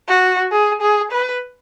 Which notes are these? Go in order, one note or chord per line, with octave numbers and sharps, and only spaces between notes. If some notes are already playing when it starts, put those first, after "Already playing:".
F#4
G#4
G#4
B4